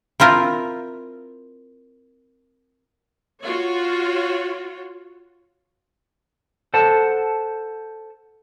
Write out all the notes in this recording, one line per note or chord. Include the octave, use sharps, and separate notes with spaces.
C4 E4 F4 A#4
F4 F#4 C#5
A4 C5 F#5 A5